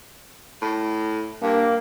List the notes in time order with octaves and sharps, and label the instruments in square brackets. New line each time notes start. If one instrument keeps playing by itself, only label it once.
[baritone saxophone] A2
[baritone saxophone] G2 [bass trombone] A#3